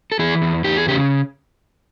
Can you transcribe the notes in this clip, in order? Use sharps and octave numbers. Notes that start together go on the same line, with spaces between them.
A4
E3 G#4
E2
E2 G4
G#4
C#3 G4